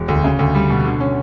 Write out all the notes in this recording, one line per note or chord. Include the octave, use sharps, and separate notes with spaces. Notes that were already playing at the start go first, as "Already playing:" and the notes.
Already playing: E1
D2
C#3
D2
G3
B2
D3
C#4